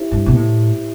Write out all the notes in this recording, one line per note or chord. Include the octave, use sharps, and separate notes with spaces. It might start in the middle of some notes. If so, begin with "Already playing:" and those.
Already playing: E4 G4 C5 E5
G2
B2
A2